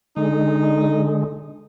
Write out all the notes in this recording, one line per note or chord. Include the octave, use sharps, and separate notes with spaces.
D3 G#3 D#4